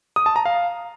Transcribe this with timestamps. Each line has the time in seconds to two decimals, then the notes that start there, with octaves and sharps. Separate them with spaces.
0.16 D#6
0.26 A5
0.36 A#5
0.45 F5